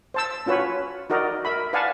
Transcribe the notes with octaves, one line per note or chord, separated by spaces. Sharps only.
C5 A5 E6
C#4 F4 F#4 B4 C#5
D#4 F#4 A#4 D5 D#5
A#4 E5 B5
B4 D5 F5 F#5 G#5 A5